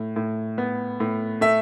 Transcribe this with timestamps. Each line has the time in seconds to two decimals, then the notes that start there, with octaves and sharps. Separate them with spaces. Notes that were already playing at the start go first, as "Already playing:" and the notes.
Already playing: A2
0.16 A2
0.58 B3
1.00 A2
1.41 A3 E5